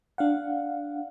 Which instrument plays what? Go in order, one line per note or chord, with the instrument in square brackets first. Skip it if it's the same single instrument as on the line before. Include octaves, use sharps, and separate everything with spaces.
[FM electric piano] D4 F5 F#5